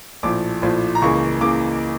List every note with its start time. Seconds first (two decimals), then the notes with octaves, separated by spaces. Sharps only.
0.23 A#1 A2 F3 D6
0.62 A#1 A2 F3
0.95 A#5
1.02 C#2 C#3 E3 A#3 C#6
1.41 C#3 E3 A#3 D6